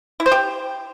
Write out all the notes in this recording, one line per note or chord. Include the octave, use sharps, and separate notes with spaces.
E4
C5
G4